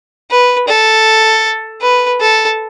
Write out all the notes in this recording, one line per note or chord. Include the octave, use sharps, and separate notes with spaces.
B4
A4
B4
A4